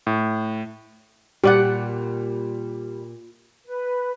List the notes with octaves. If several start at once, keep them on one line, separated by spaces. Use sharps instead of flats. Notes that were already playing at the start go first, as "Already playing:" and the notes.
A2
A#2 G3 G4 D5 F#5
B4